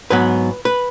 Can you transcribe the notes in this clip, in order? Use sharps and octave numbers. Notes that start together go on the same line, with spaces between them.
G#2 F#3 B3 B4
B4